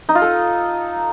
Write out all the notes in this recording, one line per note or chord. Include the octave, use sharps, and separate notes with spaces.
D#4
F4
A4